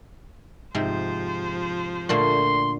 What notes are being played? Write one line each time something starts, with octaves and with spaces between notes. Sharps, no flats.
G#2 C3 F3 C5 C6
A#2 D3 A3 C6